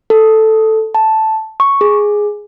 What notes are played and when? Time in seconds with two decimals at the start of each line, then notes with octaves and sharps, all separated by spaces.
0.10 A4
0.95 A5
1.60 C#6
1.81 G#4